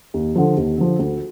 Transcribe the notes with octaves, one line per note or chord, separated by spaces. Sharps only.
D#2
D3 F3
D#2
D3 F3
D2